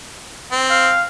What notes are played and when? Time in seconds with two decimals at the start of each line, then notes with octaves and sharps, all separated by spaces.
0.52 C4
0.70 F5